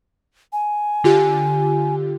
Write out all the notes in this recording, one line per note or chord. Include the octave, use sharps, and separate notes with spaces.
G#5
D3 F4 G4